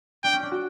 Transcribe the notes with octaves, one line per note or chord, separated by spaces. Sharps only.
D4 G5
C#4
D4
F#4